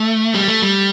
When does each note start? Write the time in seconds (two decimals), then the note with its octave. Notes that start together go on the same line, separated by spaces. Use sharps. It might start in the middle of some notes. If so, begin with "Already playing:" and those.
Already playing: A3
0.35 G3
0.48 A3
0.62 G3